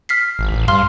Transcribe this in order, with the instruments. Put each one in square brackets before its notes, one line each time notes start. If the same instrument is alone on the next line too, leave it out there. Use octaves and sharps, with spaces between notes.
[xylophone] F6 B6 C7
[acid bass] G#1
A1
[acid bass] G2 [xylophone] F5 C6 F6